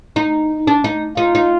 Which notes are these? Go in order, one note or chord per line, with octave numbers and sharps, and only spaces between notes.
D#4
D4
D#4
D#4 F4
D#4